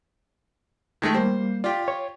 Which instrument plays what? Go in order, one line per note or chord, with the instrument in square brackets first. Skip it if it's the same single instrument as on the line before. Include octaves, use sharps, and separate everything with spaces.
[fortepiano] D#3 G#3 A3
[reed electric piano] G3 A#3 [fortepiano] C5
[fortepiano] F4 G4 [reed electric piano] D5
[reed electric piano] C#5